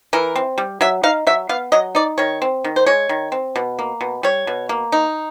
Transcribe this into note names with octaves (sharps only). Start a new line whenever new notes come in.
E3 A#4
C4
G3
F#3 E5
D#4 F5
F#3 E5
B3 F5
F#3 D#5
D#4 D5
D#3 C#5
C4
D#3
C5
G#3 C#5
D#3
C4
B2
A#3
B2
G3 C#5
B2
A#3
D#4